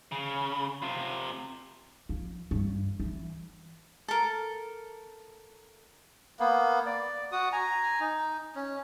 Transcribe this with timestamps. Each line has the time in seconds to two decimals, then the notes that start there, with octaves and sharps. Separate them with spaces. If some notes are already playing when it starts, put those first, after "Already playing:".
0.12 C#3
0.82 C3 F4
2.09 F3
2.51 G2
3.00 E3
4.08 A4 A#4
6.40 A#3 B3
6.86 D5
7.32 F#4 D#6
7.52 G#5 A#5
8.00 D#4
8.55 C#4